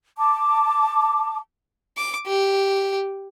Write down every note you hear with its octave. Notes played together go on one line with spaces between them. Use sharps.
A5 D6
D6
G4